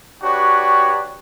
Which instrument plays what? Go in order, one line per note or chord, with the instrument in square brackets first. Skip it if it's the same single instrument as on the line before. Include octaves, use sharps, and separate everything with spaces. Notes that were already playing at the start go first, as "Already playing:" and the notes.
[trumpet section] D4 F#4 G4 B4 C#5